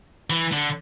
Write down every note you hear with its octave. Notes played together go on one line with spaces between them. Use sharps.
E3
D3